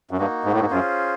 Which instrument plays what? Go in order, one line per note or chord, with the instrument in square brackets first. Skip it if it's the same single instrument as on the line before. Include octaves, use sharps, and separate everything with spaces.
[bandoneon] F#2
[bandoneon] G2 [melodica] A#3 D#4 F#4
[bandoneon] G#2
A2
G#2
[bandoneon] F#2 [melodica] C#4 F4 G#4 C5